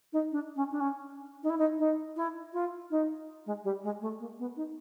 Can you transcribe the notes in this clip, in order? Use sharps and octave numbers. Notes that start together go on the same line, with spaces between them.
D#4
D4
C#4
D4
C#4
D#4
E4
D#4
D#4
E4
F4
D#4
G#3
G3
G#3
A3
A#3
B3
D#4